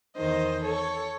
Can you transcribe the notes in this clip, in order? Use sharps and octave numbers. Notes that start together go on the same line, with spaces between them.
E2 D#3 C5 D#5
A4 C#5